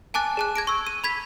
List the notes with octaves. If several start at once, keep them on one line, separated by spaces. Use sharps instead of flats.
G#5 A5 D6 F#6 A6
G#4 A5 F#6
G#6 A#6 D7
C#6 E6
D#7
B5 G#6 B6